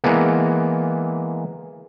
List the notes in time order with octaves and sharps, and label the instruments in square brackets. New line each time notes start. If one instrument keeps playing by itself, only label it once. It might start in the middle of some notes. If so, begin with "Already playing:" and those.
[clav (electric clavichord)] E3 G#3 A#3 B3